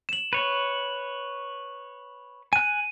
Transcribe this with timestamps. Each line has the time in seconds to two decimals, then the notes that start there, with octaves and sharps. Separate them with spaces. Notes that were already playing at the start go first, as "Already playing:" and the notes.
0.09 E7 F#7
0.33 B4 C#5
2.53 G#5 F#6 D#7